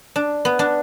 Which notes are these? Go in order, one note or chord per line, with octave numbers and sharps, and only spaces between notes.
D4
B3
D4